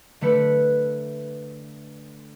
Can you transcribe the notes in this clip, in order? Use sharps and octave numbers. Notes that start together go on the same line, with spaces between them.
D3 A3 B4 C#7